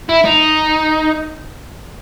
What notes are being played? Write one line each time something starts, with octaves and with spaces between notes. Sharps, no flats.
E4
D#4